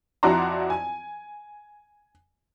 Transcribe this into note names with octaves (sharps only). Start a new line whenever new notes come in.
F2 E4 F#4 D5 A#5 C6
G#5